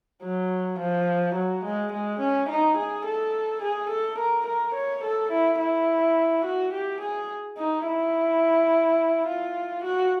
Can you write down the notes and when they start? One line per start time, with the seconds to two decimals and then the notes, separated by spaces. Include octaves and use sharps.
0.23 F#3
0.79 F3
1.35 F#3
1.64 G#3
1.93 G#3
2.20 C#4
2.49 D#4
2.77 G#4
3.05 A4
3.62 G#4
3.90 A4
4.19 A#4
4.47 A#4
4.75 C#5
5.04 A4
5.32 E4
5.60 E4
6.45 F#4
6.73 G4
7.01 G#4
7.58 D#4
7.87 E4
9.27 F4
9.85 F#4